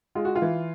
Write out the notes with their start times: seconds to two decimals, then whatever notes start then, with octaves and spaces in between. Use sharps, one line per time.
0.15 G#3 F4
0.25 F#4
0.36 F4
0.42 E3